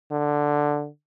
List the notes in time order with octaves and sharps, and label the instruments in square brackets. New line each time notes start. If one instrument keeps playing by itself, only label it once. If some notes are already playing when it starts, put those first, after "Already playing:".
[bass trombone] D3